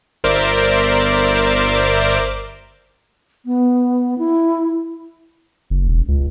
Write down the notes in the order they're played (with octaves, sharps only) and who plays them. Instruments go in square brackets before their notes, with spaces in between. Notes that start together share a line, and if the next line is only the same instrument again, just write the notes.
[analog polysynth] G1 A#4 C5 D5 E5 D6
[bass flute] B3
E4
[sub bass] F#1
E1
C#2